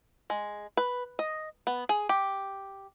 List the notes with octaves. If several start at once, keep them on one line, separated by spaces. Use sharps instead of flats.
G#3
B4
D#5
B3
G#4
G4